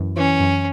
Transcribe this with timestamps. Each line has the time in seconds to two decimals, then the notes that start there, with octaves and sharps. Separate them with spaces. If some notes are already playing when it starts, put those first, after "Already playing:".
Already playing: F#2 E3
0.17 E3 C#4
0.40 F#2